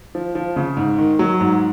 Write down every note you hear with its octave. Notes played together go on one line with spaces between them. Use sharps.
F3
F3
C#3
G#2
D#3
F#3
G#2